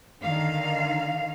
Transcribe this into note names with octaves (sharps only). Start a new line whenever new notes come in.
D3 D#3 F5